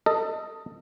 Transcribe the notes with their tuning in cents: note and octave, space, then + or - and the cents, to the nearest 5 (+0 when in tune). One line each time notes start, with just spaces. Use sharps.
A4 +30 D#5 +5